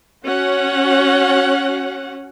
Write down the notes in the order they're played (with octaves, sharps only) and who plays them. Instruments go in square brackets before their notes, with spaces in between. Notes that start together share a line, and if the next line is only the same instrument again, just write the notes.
[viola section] C#4 F#4 F#5